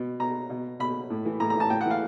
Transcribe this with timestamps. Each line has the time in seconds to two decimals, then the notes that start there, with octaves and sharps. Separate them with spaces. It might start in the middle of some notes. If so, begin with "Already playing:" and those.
Already playing: B2
0.20 B2 A#5
0.50 B2
0.79 B2 B5
1.10 A2
1.25 E3
1.40 A2 A#5
1.50 A#5
1.55 E3 A5
1.70 A2 G5
1.81 F#5
1.86 E3 F5